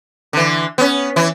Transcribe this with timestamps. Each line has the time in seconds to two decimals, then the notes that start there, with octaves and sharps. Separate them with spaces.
0.33 D3 E3
0.78 B3 C#4
1.16 E3 E4